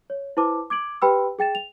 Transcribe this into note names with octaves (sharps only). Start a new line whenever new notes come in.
C#5
E4 B4 C5 A5 D6
D6 G#6 D7 F#7
G4 B4 G5 B5 C6 E6
G#4 G5 A6 E7
F7